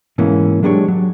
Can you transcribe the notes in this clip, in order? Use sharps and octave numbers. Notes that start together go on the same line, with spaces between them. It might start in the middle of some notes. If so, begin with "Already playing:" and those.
G#2 B2 E3 A#3 C#4
F#3 G#3 D4 G4 B4 C#5
F#3